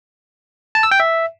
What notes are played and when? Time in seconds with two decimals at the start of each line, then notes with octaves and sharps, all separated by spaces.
0.75 A5
0.83 E6
0.91 G5
1.00 E5